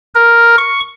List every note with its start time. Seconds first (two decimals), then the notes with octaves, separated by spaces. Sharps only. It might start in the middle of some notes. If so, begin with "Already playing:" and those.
0.15 A#4
0.58 C#6